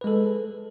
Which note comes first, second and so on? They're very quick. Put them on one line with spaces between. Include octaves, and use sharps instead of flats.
B4 G#3 A4